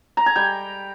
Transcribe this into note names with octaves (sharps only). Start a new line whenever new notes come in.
A#5
G#5
G3 G5